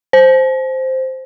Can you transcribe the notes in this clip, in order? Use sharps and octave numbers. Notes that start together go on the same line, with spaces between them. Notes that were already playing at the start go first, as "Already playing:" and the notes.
C5